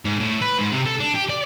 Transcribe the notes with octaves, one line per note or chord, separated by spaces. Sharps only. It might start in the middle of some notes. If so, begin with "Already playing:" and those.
G#2
A2
B4
G#2
C3
A4
D4
G4
D5